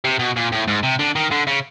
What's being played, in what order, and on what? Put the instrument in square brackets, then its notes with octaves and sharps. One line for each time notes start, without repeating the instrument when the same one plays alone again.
[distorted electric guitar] C3
B2
A#2
A2
G#2
C3
D3
D#3
D3
C#3